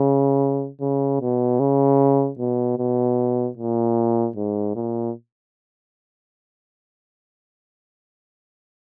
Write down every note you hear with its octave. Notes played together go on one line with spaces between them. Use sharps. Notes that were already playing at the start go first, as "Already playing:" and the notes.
Already playing: C#3
C#3
B2
C#3
B2
B2
A#2
G#2
A#2